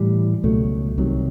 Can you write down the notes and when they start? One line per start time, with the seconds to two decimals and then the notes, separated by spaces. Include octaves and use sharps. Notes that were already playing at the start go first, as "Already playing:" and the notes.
Already playing: A2 E3 G3
0.43 C#2 B2 F#3 A3
0.97 C2 C3 D#3 F#3